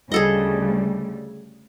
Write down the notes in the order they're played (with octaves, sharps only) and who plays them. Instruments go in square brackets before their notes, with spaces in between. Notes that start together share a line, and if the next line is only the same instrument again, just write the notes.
[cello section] D2 C#3 G3 [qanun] G#4 A4 D#5